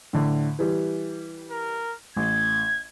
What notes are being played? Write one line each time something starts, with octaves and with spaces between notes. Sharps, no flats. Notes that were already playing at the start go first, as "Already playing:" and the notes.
A2 D3
E3 G3
A#4
A1 G#6